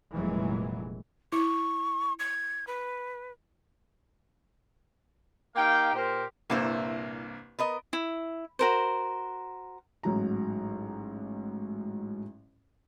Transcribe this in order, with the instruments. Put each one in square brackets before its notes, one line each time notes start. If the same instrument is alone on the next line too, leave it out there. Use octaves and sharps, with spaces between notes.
[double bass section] F1 A#2 E3 F#3 G#3
[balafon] E4 [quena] C#6
[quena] G#6
B4
[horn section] A#3 D#4 G4 F5 G5
A#2 G4 A#4 C5
[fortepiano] C2 G2 A#3 [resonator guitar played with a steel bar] A#2 E4 C5
[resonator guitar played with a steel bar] B3 A#4 D#5
[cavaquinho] E4
F#4 A#4 C5
[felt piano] A1 G#2 F#3 A#5